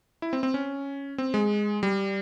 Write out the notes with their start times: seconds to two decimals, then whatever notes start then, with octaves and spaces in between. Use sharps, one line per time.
0.22 E4
0.33 C4
0.43 C4
0.54 C#4
1.18 C4
1.34 G#3
1.83 G3